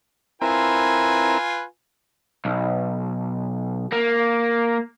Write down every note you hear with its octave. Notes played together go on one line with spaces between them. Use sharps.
C4 E4 F4 A#4 B4 G#5
B1
A#3